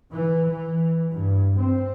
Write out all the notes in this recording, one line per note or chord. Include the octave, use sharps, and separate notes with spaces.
E3
E3
G2
C4